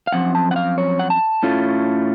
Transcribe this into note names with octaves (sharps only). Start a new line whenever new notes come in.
F5
F#2 F3 C4 F#5
A5
F#5
F5
C#5
F#5
A5
A2 A3 C#4 F4